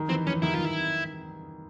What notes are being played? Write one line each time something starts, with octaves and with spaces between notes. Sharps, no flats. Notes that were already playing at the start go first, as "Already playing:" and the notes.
Already playing: D#3
E3 C4
E3 C#4
D#3 E4
D#3 F4
E4